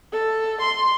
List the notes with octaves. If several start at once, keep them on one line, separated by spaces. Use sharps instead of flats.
A4
C6